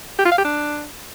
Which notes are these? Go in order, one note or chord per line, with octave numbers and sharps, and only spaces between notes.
G4
F4
F5
G4
D4